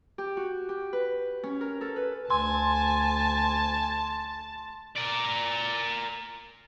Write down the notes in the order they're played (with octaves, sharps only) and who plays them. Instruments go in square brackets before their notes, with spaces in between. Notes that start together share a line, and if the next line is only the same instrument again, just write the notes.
[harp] G4
F#4
G4
B4
C#4
A#4
A4
B4
[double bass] D2 [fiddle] G#5 [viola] A5 [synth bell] C6
[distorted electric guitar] A#4 D5